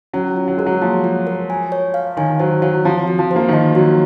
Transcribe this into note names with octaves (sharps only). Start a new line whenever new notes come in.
F#3 C#4
F4
F#3
G#3 A#4
F#3
F3 A#3
F4
A#4
G#5
C#5
F5
D#3 G#5
F#3 C5
F#3 F5
F3 C4
F#4
F3
C5
A#3
D#3
F3 D#5
F#3 F#4